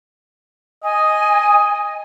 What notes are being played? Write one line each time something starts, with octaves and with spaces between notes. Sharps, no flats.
D#5 G#5